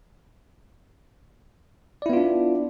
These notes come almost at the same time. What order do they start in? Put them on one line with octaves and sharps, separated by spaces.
D5 E4 B3 F4 D4